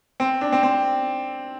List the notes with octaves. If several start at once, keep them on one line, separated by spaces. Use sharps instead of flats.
C4
D4
C4
C4